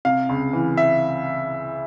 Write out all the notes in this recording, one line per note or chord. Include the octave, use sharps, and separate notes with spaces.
C3 F5
C#2
E3
E5